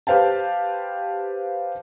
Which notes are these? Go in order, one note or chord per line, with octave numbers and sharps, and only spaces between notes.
G4 B4 C5 F5 G5 A5